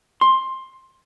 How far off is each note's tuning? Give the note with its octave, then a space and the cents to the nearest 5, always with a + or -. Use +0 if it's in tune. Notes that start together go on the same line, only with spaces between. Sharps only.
C6 +15